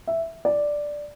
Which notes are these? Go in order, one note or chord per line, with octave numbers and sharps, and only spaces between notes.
E5
D5